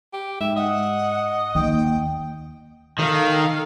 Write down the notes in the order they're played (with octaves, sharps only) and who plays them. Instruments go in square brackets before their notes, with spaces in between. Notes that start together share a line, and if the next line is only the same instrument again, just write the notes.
[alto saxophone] G4
[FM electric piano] G#2 [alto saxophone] E5
[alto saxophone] D#5 [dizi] F#5
[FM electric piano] D#2 [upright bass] A#3 [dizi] G5
[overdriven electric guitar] D#3 [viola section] A4 F5